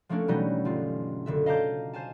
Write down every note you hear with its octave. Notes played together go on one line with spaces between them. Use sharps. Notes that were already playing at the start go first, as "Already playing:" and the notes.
F3 A3 A#3 C#4 D4
B2 E3 F#3 G3 A3 D#4
G1 F4
F#1 D3 E5
D#5 F5 A5 A#5 D6 G6
C5 F5 G#5 A5